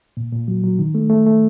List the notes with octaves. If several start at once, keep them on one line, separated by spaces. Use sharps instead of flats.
A#2
A#2
F#3
F#3
D#3
A3
A3
A3